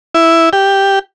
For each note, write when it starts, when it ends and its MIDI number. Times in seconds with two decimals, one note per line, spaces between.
0.14 0.49 64
0.53 0.99 67